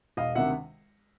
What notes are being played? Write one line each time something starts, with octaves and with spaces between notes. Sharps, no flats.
E1 D#5 F5
D2 C3 D#3 E5 F#5